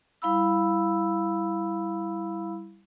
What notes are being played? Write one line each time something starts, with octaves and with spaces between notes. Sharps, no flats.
G3 E4 F5 B5 E6